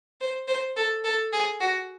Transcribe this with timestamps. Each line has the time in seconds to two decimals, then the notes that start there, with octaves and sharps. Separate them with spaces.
0.21 C5
0.48 C5
0.76 A4
1.04 A4
1.33 G#4
1.60 F#4